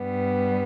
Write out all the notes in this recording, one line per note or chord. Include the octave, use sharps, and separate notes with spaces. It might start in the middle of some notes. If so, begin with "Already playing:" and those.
Already playing: G2 G3 B3